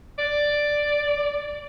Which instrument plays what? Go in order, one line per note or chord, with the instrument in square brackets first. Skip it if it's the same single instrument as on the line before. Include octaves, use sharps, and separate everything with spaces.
[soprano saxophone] D5